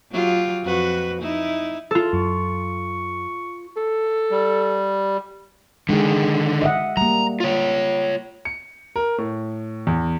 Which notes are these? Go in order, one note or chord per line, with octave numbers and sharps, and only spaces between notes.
F#3 F4 G4
F2 F#4 B4
D#4 E4
F4 A4
F#2 C#6
A4
G3
D3 D#3 G#3 G#4
D#5 E5 F#5
G3 A#3 A#5
F4 C#5
C#7
A#4
A2
E2